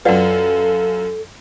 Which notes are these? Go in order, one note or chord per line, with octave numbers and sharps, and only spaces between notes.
F#2 F4 A4 B4 D5 F#5